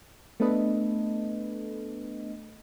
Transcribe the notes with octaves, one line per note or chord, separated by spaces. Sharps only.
A3 B3 D4 A4 B4 D#5